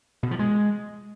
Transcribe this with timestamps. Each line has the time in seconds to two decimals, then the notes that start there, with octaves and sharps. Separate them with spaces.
0.23 B2
0.31 F3
0.39 G#3